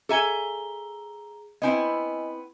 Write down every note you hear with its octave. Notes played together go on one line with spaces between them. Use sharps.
G#4 A4 E5 G#5 A#5 G7
B3 C4 E4 D#5 G#5